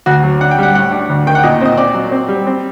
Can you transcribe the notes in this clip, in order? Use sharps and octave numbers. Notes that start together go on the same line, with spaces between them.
D2 F#4
F#3
D4 F#5
G5
G3 F#5
A2 F#5
D4
D2
D#3 G5
F#5
A#2 D#5
C4 D#5
C4 D5
F#3
C4
G3
C4